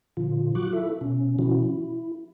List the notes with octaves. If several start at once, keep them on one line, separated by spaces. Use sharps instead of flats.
A#2 D3 F3 F4
F#3 F4 F#4 C#6 D6 F#6
E4 F4 A4 E5
B2 C#4
B2 E3 F3 C#4 E4 F#4
E4